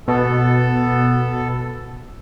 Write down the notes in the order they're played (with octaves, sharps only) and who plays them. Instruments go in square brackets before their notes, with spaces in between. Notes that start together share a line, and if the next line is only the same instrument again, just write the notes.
[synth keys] B2 [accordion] B3 A4